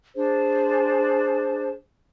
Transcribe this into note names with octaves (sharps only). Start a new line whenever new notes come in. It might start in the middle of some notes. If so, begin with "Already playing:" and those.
D4 G#4 C5